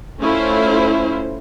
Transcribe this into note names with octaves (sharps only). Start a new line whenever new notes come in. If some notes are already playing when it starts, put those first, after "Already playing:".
A3 C#4 E4 F4 C5